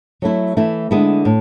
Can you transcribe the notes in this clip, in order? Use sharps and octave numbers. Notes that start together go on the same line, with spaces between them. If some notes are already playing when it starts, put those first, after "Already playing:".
F#3 A3 E4
E3 A3 E4
D3 G#3 B3 E4
A2